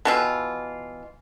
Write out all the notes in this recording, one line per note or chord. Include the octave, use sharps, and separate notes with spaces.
B2 E3 F4